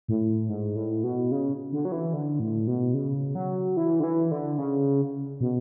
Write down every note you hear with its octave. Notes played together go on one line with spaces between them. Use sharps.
A2
G#2
A2
B2
C#3
D3
F#3
E3
D3
A2
B2
C#3
F#3
E3
D3
E3
D3
C#3
B2